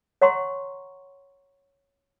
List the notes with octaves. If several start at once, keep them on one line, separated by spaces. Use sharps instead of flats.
C#5 F#5 A#5 C6 C#6